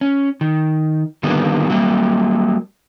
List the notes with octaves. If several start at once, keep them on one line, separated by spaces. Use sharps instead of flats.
C#4
D#3
D3 D#3 G3 A#3 B3
F#3 G3 A#3